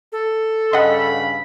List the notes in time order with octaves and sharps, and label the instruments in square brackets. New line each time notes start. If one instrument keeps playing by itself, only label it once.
[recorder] A4
[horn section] G2 C#3 B5 [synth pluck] D#5 F#5